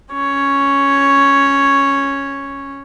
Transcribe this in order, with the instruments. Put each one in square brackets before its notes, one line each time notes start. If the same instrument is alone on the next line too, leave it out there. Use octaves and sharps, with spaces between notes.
[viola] C#4 C#5